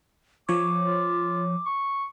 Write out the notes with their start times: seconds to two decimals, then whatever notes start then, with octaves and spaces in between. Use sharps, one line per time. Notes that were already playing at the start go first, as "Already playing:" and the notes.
0.49 F3 C#5 D6
0.83 F4
1.66 C#6